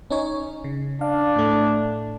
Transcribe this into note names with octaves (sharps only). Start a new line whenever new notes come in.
C#4 D#4 C#5
C#3
D4 F5
A2 A3